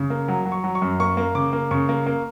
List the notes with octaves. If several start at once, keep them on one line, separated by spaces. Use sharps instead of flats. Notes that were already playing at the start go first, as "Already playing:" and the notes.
Already playing: C#3
A#3
F#3
F#3
C#6
F#3
C#6
F#2
A#3 C#6
A#3
C#3 D6
A#3
C#3 C#6
A#3
A#3